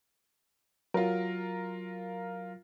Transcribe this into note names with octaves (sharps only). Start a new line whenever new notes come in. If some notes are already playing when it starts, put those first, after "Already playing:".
F#3 F4 A#4